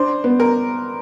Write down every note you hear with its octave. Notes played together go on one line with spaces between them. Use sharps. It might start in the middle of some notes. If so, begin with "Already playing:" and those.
Already playing: D4 C5
B3
A#4